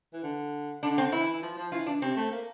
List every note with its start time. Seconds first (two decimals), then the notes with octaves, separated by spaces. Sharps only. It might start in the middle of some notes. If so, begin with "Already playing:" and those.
0.13 E3
0.23 D3
0.83 D3 D4
0.98 C4
1.12 E3 E4
1.42 F3
1.57 F3
1.72 E3 F4
1.86 D4
2.02 C3 C4
2.17 A3
2.32 A#3